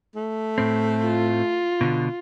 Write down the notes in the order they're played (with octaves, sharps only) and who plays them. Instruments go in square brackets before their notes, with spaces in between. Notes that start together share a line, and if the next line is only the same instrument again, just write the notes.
[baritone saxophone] A3
[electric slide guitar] A2 C4
[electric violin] F4
[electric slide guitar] B2 D3